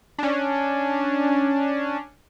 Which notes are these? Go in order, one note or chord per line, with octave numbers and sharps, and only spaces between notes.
C#4 D4